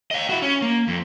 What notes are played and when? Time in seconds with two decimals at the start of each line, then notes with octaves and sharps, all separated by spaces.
0.11 D#5 F5
0.30 E4 F#4
0.42 C#4
0.62 A#3
0.88 F2